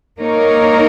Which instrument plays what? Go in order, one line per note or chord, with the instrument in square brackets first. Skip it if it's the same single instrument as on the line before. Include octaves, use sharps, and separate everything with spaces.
[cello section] A#3 D#4 A#4 C#5